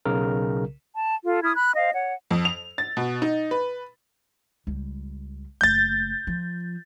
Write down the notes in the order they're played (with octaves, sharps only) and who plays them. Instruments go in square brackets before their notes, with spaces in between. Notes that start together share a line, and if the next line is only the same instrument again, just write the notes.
[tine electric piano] B1 C#3 A#4
[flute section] A5
F4 A4
E4 D#6 F6 G#6
B5 F#6
C5 D#5 F5
C#5 F#5
[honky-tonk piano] F2
F7
A6
B2
D#4
B4
[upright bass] C#2 G3
[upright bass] F#1 A3 [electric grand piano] G6 A6
[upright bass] F3